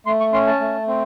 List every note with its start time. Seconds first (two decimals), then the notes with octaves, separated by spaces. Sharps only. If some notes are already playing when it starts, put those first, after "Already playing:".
0.06 A3 C6
0.21 C#6
0.33 C#4 C6
0.47 A5
0.60 A3
0.88 C4